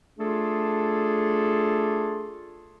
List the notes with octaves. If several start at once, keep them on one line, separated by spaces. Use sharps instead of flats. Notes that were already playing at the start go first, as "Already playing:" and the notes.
A3 D4 F4 G#4 A4